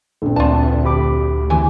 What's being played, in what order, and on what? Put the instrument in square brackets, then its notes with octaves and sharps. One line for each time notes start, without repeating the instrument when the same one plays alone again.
[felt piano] A#1 C4 [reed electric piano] A4
[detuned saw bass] D2 [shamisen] F4 A5 [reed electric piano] B4 D5
[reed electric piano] G4 B5 D6
[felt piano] E2 [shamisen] E3 C4 G#5